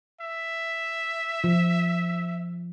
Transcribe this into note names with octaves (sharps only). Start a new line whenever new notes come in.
E5
F3